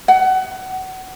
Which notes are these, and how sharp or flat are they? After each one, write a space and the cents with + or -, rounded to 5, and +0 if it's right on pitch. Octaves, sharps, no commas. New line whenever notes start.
F#5 +25